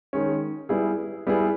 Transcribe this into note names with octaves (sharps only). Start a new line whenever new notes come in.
D#3 G#3 C#4
G3 B3 E4 G#4
G3 B3 E4 G#4